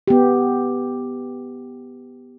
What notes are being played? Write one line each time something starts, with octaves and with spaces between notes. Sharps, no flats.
B3 G4